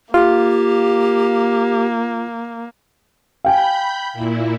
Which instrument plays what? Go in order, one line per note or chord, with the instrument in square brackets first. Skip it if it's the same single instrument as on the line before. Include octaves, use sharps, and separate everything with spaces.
[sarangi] A#3 [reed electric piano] F4 [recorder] G4
[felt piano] F5 G5 G#5 [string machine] B5 G6
[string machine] A#2 E4